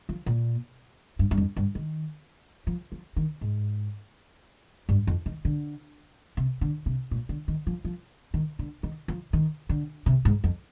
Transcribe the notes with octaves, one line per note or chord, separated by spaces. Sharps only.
F3
A#2
G2
G2
F2
G2
D#3
F3
F3
D#3
G#2
G2
F2
D#3
D3
C3
D3
C3
A#2
D3
D#3
F3
F3
D#3
D3
D#3
F3
D#3
D3
C3
G#2
F2